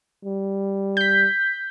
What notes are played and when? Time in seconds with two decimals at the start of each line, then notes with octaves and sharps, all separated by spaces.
0.25 G3
0.97 G6 B6